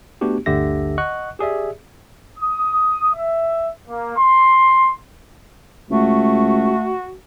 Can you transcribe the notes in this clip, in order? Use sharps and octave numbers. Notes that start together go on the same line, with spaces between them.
A3 B3 D4 F#4 G4
G1 D2 D3 G4 E5 A#6
D#5 F#5 C#6 F#6
G4 G#4 D5 E5
D#6
E5
A#3
C6
C#2 A3 F#4